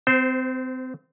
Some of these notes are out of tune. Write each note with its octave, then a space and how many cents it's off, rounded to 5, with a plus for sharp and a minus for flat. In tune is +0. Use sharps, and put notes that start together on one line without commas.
C4 -30 C5 +0